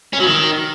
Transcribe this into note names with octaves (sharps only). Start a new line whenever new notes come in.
C#4
F#3
D#3